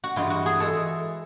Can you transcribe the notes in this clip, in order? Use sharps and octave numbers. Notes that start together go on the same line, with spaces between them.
F#4
G2 E3 G#3 F4
F#4
G#4
E3 G#3 A4